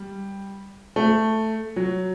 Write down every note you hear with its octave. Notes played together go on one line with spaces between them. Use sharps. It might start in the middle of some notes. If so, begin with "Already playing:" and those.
Already playing: G3
A3
F#3